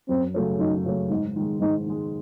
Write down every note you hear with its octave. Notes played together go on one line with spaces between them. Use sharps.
F#2 C4
C#3 F#3 A3 C#4
F#2 D#4
C#3 F#3 A3 C#4
G#2 D#4
D#3 G#3
G#2 D#4
D#3 G#3